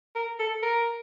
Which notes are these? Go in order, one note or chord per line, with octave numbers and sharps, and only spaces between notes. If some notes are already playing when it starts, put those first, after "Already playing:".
A#4
A4
A#4